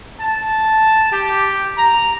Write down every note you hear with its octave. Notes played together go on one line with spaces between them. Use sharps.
A5
G4
A#5